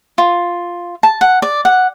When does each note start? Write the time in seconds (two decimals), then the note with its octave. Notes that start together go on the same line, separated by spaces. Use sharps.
0.18 F4
1.03 A5
1.21 F#5
1.42 D5
1.65 F#5